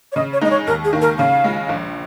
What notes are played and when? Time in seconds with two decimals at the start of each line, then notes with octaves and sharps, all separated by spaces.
0.12 C#5
0.16 C#3 D#5
0.33 C#5
0.41 G#3 D#4 D#5
0.50 C#5
0.67 D#2 A#4
0.84 G#4
0.93 D#3 A#3
1.01 A#4
1.19 C#3 F5
1.44 G#3 F4
1.69 A#1